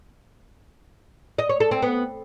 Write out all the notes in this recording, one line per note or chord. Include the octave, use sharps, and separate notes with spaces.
D#5
C#5
A4
C4
B3